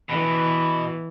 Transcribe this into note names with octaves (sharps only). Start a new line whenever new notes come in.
B2 E3